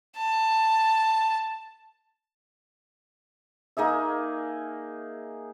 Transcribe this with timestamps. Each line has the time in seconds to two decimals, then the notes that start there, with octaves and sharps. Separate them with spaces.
0.17 A5
3.77 A#3 D#4 G#4 E5